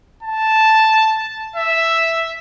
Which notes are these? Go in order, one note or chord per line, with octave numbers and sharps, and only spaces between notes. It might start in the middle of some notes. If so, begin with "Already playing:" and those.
A5
E5